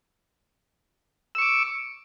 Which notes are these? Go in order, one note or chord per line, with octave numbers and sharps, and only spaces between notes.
C#6 D6 E6